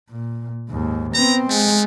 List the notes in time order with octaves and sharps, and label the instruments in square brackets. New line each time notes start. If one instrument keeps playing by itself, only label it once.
[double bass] A#2
D#2 G#2
[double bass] B3 C4 [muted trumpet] A#5
[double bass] G#3 [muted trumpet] A3